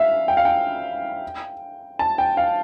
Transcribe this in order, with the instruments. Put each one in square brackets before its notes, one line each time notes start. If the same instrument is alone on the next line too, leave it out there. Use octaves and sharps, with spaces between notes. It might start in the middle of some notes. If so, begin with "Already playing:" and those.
Already playing: [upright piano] E5 F5
G5
F5
G5
A5
G5
F5